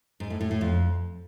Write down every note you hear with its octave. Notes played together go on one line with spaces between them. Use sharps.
G#2
A2
A2
A2
F2